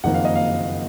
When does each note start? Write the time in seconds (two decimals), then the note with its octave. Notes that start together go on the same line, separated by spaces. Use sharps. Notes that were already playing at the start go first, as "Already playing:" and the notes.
0.04 F#1 F2 D#3 A#3 F#5
0.14 F5
0.25 D#5
0.36 F5